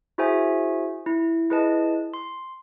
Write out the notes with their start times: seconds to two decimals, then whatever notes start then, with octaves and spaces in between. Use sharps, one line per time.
0.18 E4 F#4 G#4 C5 E5 G#5
1.06 E4
1.50 E4 G#4 B4 D#5 A5
2.14 C6